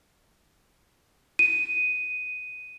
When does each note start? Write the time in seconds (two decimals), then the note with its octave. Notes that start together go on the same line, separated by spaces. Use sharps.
1.39 D#7